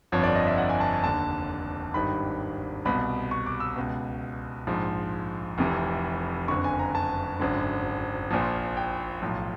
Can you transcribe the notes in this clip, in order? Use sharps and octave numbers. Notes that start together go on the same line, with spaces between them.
G1 F2 D3 F3 C#5
D5
D#5
E5
F#5
G#5
A5
F1 D#2 D3 A5
G#1 G2 D#3 B5
C2 B2 B5
C#6
D6
E6
C#2 B2
A#1 G#2 F3
F1 F2 C3 E3
F#1 F2 D3 C#6
G#5
A#5
A5
G#1 F#2 D3
A#1 A#2 F3
G5
B1 A2 F3